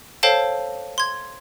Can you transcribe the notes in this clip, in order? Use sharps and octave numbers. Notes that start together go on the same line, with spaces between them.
A4 C5 C#5 F5 G5 A5
C6 G#6